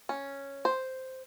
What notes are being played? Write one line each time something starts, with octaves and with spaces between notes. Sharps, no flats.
C#4
C5